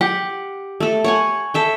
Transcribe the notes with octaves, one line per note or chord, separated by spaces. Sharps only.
G4 F#5
A3 A4
C#5 F#5 G#5
A4 E5 G5